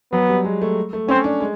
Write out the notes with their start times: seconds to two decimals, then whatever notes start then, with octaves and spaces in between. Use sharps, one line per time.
0.12 F#3 B3
0.29 G3
0.44 G#3
0.62 A3
0.93 A3
1.08 C4 C#4
1.24 D4
1.41 G#3